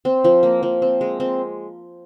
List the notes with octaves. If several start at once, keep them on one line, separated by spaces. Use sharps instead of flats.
C4
F3
A#3
F3
C4
G#3
C4